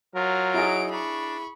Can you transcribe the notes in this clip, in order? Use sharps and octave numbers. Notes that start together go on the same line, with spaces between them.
F#3 F4 A#4
D#4 E4 G#4 D7
D4 B5 C#6